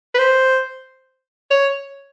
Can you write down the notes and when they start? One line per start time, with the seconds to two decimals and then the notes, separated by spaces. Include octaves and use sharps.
0.15 B4
0.18 C5
1.51 C#5